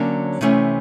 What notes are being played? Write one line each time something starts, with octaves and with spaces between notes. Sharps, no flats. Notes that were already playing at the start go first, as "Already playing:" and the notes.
Already playing: D3 F#3 A#3 C#4
C3 E3 A3 C#4